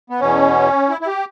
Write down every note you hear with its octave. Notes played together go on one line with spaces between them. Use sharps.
B3
E2 B2 C#4
E4
E4
G4